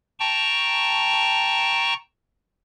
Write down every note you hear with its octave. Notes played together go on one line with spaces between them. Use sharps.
G5 A5 A#5 C#6